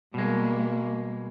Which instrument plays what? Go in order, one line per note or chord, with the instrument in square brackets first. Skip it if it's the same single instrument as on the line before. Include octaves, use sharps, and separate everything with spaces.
[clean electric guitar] B2 G#3 [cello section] G3 A#3